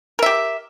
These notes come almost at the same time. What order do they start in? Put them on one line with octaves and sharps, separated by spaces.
A#4 E5 G4